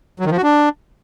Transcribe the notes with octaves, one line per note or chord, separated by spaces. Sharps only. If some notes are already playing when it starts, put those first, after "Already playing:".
F#3
D#3
F3
F#4
D4